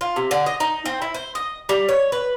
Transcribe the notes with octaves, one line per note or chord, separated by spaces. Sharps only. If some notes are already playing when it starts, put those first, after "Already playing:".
F4
C3
D3
D#5
D#4
C4
E4
C5
D#5
G3
C#5
B4